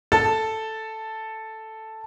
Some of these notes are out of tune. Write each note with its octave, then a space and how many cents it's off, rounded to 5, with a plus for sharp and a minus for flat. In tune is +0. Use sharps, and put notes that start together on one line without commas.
A4 +0 A5 +0